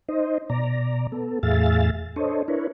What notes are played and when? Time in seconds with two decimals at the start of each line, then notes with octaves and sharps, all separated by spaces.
0.09 D#4 C5 D#5
0.50 B2 D5 A#5
1.12 B3 A4
1.43 E2 A2 G#4 E5 F5 A6
2.16 D4 A4 C5 C#5 D#5
2.48 D4 E4 A#4 B4 C#5